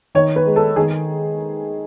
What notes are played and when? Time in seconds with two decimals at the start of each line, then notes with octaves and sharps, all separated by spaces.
0.15 D#3 C#5
0.36 B4
0.46 G#3
0.56 A4
0.76 D#3 G#4